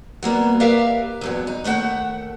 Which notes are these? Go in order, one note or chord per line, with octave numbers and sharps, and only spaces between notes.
F#3 G3 A#3 B3
G4 A#4 B4 D5 E5 F5
E2 G2 F#3
D#4
D#2 A3 G4 F#5 G5